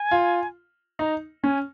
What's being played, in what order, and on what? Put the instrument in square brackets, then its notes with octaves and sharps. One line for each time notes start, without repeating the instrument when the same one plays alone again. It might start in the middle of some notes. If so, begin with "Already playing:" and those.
Already playing: [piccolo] G#5
[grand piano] F4
[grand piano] D#4 [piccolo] A#5
[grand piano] C#4 [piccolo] G#5